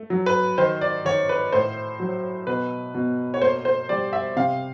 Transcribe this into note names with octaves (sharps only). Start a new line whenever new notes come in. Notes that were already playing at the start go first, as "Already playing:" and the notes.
Already playing: A3
F#3
B4
D#3 C5
D5
D#3 C#5
B4
A2 C5
F#3
B2 B4
B2
C#5
A#3 C5
C5
G3 D5
E5
C3 F5